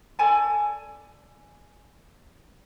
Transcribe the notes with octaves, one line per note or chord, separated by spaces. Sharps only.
A4 D5 G#5 A5